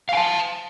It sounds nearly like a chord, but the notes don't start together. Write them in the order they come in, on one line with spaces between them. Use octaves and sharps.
F5 G#5 A5